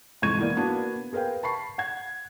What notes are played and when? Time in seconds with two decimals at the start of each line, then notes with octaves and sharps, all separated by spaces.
0.22 F2 G#2 E3 C#6 G#6 D#7
0.38 E3 A#3 B3 E4 A#4 D5
0.56 A#3 B3 D4 F#4
1.13 G#4 A#4 B4 F5 G5
1.43 A5 B5 C#6 C7
1.78 F#5 G#6